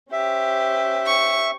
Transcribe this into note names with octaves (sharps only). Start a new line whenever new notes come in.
C#4 G4 C5 E5
C#6